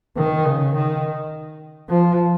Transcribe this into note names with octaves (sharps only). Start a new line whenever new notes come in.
D#3
C#3
D#3
F3